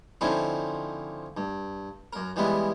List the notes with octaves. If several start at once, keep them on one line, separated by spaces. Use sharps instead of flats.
D3 F3 C4 C#4 D#4 E4
G2
F#2 A#4
E3 G3 G#3 B3 E4